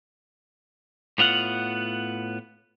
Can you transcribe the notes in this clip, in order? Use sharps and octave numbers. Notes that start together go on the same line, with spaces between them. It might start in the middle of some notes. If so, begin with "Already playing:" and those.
A2 B3 F4 F#5